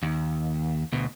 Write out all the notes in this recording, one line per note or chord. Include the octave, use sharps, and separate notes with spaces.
D#2
D2 B2